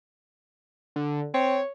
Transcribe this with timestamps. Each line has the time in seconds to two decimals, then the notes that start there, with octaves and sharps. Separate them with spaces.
0.96 D3
1.34 C4 C#5